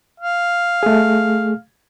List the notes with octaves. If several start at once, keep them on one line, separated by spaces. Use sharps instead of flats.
F5
A3 G#4